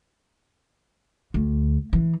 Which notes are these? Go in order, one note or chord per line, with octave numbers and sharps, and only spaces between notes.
D2
E3